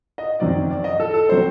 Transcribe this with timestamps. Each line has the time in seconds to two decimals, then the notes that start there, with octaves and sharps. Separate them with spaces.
0.18 D#5
0.40 F#2 D#3 F#3 C4 D5
0.70 D5
0.84 D#5
1.00 A4
1.14 A4
1.29 F#3 C4 C5